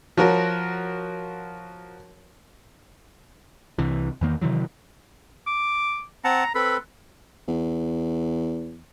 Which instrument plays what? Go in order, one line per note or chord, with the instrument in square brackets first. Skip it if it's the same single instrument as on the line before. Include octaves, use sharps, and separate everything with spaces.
[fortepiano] F3 F#4 A#4 C#5
[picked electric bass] C2 C3 E3
E2 D#3 A#3
C3 D#3 E3 F#3
[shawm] D6
[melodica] C4 F#5 A5 [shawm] A#5
[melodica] C4 A4 B4 [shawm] B5
[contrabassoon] E2